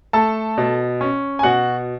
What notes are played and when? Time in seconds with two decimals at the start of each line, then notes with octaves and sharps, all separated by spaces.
0.13 A3 A4 A5
0.58 B2
1.01 C#4
1.39 G#5
1.43 B2 F#4 F#5